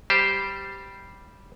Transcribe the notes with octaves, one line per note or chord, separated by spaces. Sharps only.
G3 G4 C5